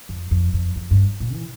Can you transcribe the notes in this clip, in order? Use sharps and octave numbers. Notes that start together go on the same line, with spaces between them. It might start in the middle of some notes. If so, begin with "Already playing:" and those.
F2
F2
F2
F2
G2
A#2
E3